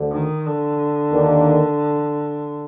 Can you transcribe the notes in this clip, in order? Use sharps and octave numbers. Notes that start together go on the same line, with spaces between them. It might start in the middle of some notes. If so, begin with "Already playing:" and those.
Already playing: D2 D3
D#3
D3
D#2 D#3 A#3 D4